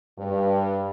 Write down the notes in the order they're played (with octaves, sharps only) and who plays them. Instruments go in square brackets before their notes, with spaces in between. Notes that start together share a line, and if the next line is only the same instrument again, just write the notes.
[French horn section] G2